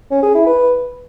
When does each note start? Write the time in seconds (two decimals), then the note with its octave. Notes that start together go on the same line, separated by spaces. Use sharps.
0.11 C#4
0.23 G#4
0.35 E4
0.47 B4